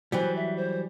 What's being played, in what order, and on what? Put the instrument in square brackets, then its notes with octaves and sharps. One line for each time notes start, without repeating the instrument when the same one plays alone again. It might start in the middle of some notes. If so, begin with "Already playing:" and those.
[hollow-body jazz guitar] E3 F#3 G3 [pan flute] C5
[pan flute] E5
C5